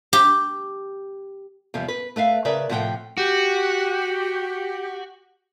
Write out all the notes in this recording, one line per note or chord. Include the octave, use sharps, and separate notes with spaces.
G4
E2 C3 F3 G3
B4
A3 B4 E5 F5
C#3 A#4 B4 D5 E5
A2 C3 F3 E4 F#5 G5
F#4 G4